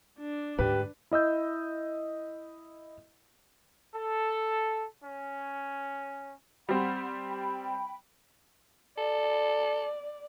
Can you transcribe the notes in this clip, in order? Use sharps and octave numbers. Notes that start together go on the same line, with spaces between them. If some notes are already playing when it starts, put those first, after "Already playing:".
D4
D2 G#2 G4 B4
E4 D#5 E6 G6
A4
C#4
G3 C4 F#5 B5
G5 B5
A4 D5